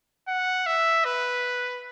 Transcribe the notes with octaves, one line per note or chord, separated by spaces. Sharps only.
F#5
E5
B4